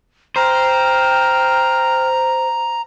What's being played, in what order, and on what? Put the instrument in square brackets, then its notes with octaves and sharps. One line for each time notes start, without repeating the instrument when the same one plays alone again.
[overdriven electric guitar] C5 [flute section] G5 F6 [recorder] A#5